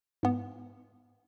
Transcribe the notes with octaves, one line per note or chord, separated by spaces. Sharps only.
G#2 B3